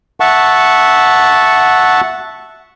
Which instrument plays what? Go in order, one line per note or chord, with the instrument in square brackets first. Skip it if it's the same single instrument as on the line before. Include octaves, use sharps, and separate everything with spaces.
[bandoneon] E5 F#5 A5 C#6